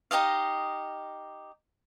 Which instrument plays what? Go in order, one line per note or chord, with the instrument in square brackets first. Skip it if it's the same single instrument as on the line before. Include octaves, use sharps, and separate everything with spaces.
[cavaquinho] D#4 G4 D#5 F5